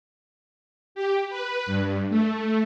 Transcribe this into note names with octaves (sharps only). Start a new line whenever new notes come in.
G4
B4
G2
A3